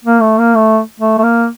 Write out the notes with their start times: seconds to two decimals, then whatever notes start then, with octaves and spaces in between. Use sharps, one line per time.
0.05 A#3
0.22 A3
0.39 A#3
0.56 A3
1.00 A3
1.18 A3
1.23 A#3